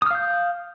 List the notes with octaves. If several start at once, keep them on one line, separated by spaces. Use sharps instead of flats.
F5 D#6 F6 G6